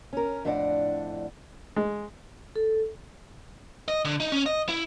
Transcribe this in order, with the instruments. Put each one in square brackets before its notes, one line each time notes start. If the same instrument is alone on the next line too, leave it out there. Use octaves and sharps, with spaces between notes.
[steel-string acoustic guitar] C#4 A#4
F2 A2 D4 D5 F#5
[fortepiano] G#3
[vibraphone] A4
[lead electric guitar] D#5
D3
D#4
C#4
D#5
E4